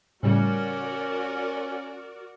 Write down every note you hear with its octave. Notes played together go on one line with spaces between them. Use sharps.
A2 C#3 G3 C#4 F#4 A#4 D5